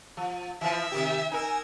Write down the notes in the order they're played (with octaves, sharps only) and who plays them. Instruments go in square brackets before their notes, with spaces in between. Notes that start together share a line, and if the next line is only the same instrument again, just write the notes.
[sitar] F3
[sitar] E3 F3 [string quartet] E5
[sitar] C3 D#3 G4
[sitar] D#4 A#4 [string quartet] G#5 E6